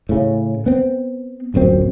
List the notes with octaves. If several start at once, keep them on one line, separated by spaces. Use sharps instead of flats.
A2 C#3
B3 C4
D1 A#1 F#2 C4